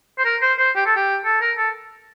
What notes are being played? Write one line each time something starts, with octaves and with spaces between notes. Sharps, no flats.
C5
A#4
C5
C5
G4
A4
G4
A4
A#4
A4